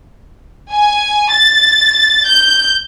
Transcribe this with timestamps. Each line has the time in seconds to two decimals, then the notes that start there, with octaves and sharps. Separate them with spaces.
0.72 G#5
1.31 A6
2.26 G6